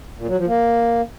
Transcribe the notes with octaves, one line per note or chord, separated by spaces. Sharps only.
A#2
F#3
F3
A#3